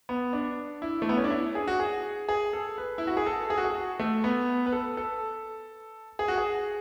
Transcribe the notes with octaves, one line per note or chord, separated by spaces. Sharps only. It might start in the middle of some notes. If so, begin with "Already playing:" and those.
B3
D4
E4
A3
B3
C#4
D4
E4
G#4
F#4
G#4
G#4
A4
B4
E4
F#4
G#4
A4
G#4
F#4
G#4
F#4
A3
B3
B4
A4
A4
G#4
F#4
G#4